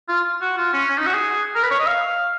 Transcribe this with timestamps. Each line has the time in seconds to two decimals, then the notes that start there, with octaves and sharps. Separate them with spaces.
0.09 F4
0.41 F#4
0.57 F4
0.74 C#4
0.90 C#4
0.98 D#4
1.06 F#4
1.14 G#4
1.55 A#4
1.63 B4
1.71 C#5
1.80 D#5
1.87 F5